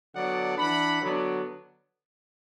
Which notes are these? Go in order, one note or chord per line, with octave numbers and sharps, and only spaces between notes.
D3 F#3 B3 D4 D5 F#5
E3 D4 F#5 B5
D3 F#3 B3 D4